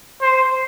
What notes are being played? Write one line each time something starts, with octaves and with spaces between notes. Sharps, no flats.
C5